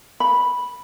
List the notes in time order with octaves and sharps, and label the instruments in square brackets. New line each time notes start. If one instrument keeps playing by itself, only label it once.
[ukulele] B5